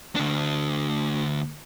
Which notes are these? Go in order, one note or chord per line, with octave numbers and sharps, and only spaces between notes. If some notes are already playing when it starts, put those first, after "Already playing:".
D2 D4